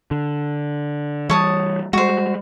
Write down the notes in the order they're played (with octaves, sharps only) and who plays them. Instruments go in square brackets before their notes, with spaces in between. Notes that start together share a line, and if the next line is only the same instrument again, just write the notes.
[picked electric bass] D3
[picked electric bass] E3 G3 [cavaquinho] C#5 A5 D#6
[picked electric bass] G3 G#3 [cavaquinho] F#4 C5